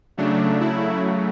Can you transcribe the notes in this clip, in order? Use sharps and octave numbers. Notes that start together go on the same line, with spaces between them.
C#3 F#3 A3 D4
E4